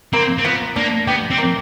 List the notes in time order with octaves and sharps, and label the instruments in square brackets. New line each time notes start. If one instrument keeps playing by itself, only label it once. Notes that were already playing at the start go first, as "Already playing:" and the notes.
[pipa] A#3 [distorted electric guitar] C4
[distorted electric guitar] C4
[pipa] F3 [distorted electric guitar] B3
[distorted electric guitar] A#3 [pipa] D4
[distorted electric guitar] B3 [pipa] G4
[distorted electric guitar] C4
[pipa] A#3